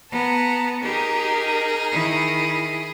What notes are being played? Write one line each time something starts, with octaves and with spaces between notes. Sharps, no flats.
B3 A5 A#5
D#4 G4 G#4 A#4 D#6
D#3 E4